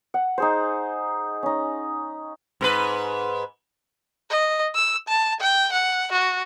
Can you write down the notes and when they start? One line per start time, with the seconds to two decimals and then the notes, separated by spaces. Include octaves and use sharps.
0.14 F#5
0.38 D#4 G#4 C5
1.43 C#4 D#4
2.61 G#2 A#4 B4
4.30 D#5
4.75 E6
5.08 A5
5.41 G5
5.72 F#5
6.12 F#4